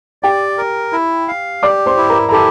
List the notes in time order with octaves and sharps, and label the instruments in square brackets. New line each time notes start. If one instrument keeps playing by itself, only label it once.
[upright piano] G4 G5 [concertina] D5
[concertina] A#4
E4
F5
[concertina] G4 [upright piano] D5 D6
[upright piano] C5 C6
[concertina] E4
[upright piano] A#4 A#5
A#5
[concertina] G4 [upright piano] A4 A5